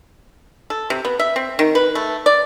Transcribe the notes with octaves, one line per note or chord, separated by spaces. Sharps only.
A4
C3
B3
E5
C4
D#3
B4
A3
D5